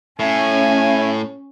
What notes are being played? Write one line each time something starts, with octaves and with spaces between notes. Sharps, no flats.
A2 C#4 E5 G#5